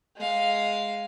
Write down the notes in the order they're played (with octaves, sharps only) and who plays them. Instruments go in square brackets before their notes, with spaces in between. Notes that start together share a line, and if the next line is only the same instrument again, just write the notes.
[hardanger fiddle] G#3 F5